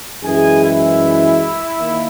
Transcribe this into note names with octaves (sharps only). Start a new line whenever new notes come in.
F#2 E3 G#3 G#4 G#5
E4 E5
D#3 A#3